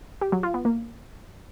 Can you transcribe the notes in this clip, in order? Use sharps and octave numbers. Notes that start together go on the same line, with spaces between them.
G4
F#3
F4
B3
A#3